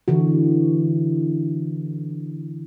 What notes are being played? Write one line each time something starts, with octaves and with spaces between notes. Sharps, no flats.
D3 E3 F#4